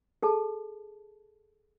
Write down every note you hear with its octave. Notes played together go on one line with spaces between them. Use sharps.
G#4 A4 A5